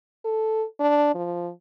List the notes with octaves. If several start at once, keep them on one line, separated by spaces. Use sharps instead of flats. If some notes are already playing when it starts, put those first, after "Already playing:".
A4
D4
F3